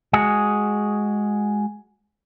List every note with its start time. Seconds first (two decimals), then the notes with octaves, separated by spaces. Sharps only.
0.13 G#3 F#4 G#4